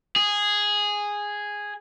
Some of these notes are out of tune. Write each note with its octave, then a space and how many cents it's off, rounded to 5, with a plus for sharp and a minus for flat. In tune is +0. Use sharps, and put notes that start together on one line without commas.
G#4 -5